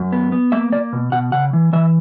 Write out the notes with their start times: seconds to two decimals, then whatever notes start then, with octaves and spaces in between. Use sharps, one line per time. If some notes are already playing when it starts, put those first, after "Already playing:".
Already playing: F#2
0.12 B3
0.32 B3
0.52 A#3 E5
0.72 A#3 D5
0.93 B2
1.12 B2 F#5
1.32 C#3 F#5
1.53 E3
1.73 E3 E5